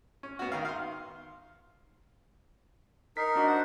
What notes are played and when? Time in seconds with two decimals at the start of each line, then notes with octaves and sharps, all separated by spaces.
0.23 C#4
0.39 B3 F#4
0.52 D#3 F5
0.65 F5 C6
3.17 D#4 A#4 B6 C7
3.36 D4 F#4 D#5
3.47 C5 F#5